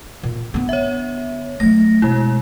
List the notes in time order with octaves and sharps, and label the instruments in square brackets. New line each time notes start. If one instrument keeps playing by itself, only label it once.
[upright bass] A#2
D3 B3
[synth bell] C#5 E5
[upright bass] F#3 A3 [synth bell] A#6
[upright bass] B2 [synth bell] G#3 E4